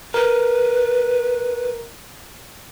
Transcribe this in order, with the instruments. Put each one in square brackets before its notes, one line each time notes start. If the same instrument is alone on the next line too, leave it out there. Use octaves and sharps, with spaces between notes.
[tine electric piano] A#4 [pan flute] B4